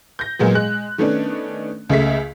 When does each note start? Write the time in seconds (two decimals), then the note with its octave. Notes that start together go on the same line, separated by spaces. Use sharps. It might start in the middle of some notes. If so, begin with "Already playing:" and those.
0.19 G6 A#6
0.39 A#2 F#3 G#3 B3
0.54 G#3 F#6
0.98 D#3 A3 B3 C#4 D4
1.90 C#2 C#3 A3 E5 B6